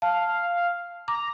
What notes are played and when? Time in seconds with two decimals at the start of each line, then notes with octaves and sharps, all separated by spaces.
0.02 F5 A5
1.08 A#5 D6